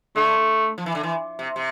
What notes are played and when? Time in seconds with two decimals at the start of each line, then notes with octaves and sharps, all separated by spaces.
0.16 D3 A3
0.78 F3
0.86 E3
0.95 D3
1.03 E3
1.39 C3
1.56 C3